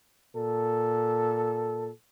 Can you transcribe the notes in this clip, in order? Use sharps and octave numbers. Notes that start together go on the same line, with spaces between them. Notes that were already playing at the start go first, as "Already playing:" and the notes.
A#2 A4